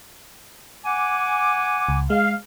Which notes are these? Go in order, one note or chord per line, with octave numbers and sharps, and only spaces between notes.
F#5 G#5 D6
C#2
G#3 F5